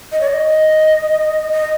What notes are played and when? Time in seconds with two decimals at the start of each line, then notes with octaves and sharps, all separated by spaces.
0.12 D#5
0.21 C#5
0.28 D#5
1.51 D#5